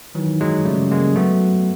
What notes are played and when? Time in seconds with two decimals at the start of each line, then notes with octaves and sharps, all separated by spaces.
0.15 D#3 E3 F#3
0.41 F#3 G#3
0.65 C#3 G3 A3
0.91 G#3 A#3
1.16 F#3 A3 B3